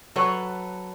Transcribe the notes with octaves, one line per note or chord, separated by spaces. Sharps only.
F#3 A4 B4 C#5